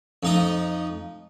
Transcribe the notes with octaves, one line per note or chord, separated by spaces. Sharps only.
F2 D#4 D#5